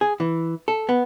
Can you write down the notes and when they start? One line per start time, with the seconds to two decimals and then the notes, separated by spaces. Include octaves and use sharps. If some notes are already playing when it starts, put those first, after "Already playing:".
0.01 G#4
0.20 E3
0.68 A4
0.89 B3